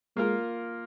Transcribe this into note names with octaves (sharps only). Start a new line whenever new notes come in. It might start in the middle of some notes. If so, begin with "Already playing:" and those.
G#3 A#3 F4 A#4